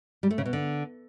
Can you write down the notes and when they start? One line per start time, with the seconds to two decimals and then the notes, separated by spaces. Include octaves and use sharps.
0.23 G3
0.31 A3
0.38 C#3
0.45 B2
0.53 D3